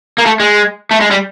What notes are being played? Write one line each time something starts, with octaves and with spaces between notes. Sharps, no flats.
A#3
A3
G#3
A3
G#3
G3